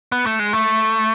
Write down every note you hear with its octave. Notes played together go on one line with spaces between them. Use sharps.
B3
A3
G#3
A3